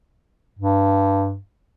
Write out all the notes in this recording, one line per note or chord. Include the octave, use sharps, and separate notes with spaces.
G2